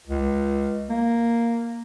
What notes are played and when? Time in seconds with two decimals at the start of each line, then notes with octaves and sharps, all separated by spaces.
0.07 C#2
0.90 A#3